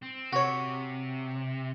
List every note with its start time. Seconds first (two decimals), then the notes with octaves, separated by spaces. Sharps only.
0.03 C4
0.33 C3 F#4 C#5